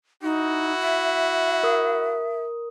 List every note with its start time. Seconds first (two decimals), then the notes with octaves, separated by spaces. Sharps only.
0.22 D#4 E4 F#4
0.80 E5
1.63 A#4 D#6